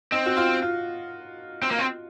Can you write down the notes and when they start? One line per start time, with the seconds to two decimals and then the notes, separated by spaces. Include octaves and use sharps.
0.12 C4 D#4
0.26 F#4
0.37 F4
0.62 F4
1.62 C4
1.71 A#3
1.78 C4